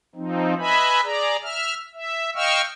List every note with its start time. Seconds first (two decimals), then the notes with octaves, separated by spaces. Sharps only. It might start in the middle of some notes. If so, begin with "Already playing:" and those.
0.15 F3 C4 D#4
0.59 B4 D#5 E5 G#5 B5
1.04 G#4 D5 A#5
1.43 E5 F6
1.94 E5
2.35 D#5 F5 G5 C#6 E6 F6